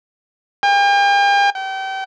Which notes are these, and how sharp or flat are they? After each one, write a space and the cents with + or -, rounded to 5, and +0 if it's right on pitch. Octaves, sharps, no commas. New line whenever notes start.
G5 +45
G5 -30